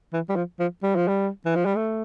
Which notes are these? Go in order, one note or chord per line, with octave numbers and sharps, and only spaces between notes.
E3
G3
F3
F3
G3
F3
G3
E3
F3
G3
A3